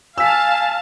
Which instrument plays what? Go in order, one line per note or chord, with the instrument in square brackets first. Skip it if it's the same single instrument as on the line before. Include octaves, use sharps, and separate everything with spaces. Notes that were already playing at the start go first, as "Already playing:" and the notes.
[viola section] F5 A5 [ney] G#5 [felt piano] E6 B6